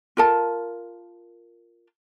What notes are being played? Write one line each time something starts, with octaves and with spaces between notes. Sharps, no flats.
F4 A#4 A5